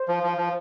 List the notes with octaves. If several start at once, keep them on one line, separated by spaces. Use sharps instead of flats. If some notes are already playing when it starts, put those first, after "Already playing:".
Already playing: C5
F3
F3
F3